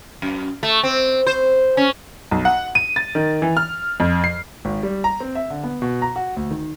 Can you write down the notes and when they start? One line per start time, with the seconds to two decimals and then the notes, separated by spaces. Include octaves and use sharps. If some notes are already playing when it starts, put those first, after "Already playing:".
0.22 F#2
0.63 A3
0.83 C4
1.27 C5
1.77 C#4
2.31 B1
2.45 F#5
2.75 D#7
2.96 A6
3.15 D#3
3.42 E3
3.57 F6
4.00 F2
4.24 C7
4.65 G#1
4.83 G3
5.04 A#5
5.20 C4
5.35 E5
5.50 D3
5.64 B3
5.82 B2
6.02 A#5
6.16 F#4
6.37 D2
6.51 D#3